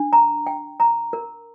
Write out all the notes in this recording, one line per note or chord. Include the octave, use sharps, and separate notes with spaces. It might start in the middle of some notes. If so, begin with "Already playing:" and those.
Already playing: D4
A#5
G5
A#5
A#4